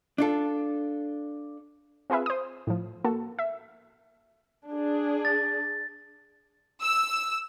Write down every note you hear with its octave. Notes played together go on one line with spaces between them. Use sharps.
D4 F4 A4
C4 F4 G#4 B4 E5
C5 D#6
A2 F3
A#3 F#4 A4
E5
D4 G#4
A6
E6